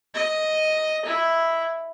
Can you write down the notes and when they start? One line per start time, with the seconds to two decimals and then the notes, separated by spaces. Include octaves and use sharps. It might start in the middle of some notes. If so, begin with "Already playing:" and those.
0.14 D#5
1.05 E4